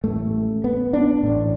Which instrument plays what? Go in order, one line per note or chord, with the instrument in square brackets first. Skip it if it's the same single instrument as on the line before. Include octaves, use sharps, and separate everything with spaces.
[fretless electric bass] A1 A2 A3
B3
D4
A1 A2